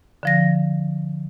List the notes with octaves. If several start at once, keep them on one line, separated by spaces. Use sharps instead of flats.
D3 F3 A#6